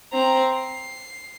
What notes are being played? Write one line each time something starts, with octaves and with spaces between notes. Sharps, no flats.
C4 A#5
C7